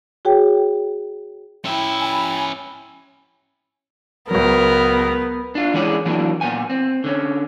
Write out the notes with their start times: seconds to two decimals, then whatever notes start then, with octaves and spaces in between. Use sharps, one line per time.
0.25 F#4 G#4 C#5 G5
1.65 C#4 E4 E5 G5
2.00 G#5 B5
4.31 C#2 F#3 B3 A#4
5.55 D4 F4
5.74 E3 G#3 C#4 G#4 D5
6.06 E3 F#3 A#3 D4
6.41 A#2 B3 G#5
6.70 C4
7.04 D3 C#4